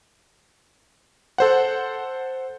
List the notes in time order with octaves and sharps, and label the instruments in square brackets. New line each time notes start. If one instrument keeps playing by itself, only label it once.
[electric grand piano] A4 C5 F#5